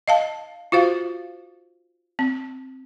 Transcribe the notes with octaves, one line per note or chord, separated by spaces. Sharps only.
D#5 F5 A5
F4 F#4 C5 F5
C4